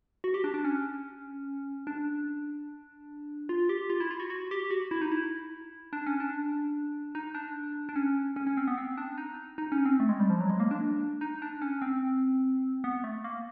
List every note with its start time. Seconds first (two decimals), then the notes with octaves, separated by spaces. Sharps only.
0.24 F#4
0.34 G4
0.44 D4
0.54 D4
0.64 C#4
1.87 D4
3.49 F4
3.69 G4
3.90 F4
4.00 E4
4.11 F4
4.20 F#4
4.30 F#4
4.51 G4
4.71 F#4
4.91 E4
5.01 D#4
5.12 E4
5.93 D4
6.07 C#4
6.20 D4
7.15 D#4
7.35 D4
7.89 D4
7.96 C#4
8.36 C#4
8.47 C#4
8.57 C4
8.67 B3
8.78 C4
8.97 D4
9.18 D#4
9.58 D#4
9.72 C#4
9.85 C4
10.00 A3
10.09 G#3
10.20 G3
10.30 F3
10.41 F#3
10.50 G#3
10.60 A#3
10.71 D4
11.21 D#4
11.42 D4
11.62 C#4
11.82 C4
12.84 B3
13.04 A3
13.24 A#3